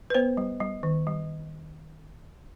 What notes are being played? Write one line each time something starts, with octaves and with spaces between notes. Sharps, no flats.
B4
B3 C5
G3
G3
D#3
G3